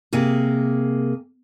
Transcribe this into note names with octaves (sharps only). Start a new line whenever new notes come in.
C3 A#3 G#4